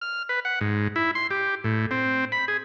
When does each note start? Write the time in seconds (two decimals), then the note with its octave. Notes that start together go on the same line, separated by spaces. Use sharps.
0.01 F6
0.29 B4
0.45 F#5
0.61 G#2
0.96 E4
1.15 C6
1.31 G4
1.64 A2
1.91 C4
2.32 B5
2.48 G#4